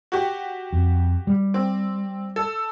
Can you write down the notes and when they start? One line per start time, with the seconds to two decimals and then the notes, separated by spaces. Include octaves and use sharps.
0.12 F#4 G4
0.73 F2
1.27 G3
1.54 C4
2.36 A4